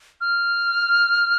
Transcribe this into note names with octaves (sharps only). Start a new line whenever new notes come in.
F6